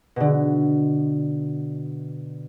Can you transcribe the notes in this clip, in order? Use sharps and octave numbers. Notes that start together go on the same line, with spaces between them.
B2 D3